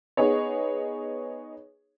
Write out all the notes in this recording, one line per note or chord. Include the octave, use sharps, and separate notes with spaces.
B3 D#4 G#4 C#5